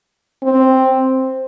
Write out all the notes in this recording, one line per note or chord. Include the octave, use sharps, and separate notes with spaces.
C4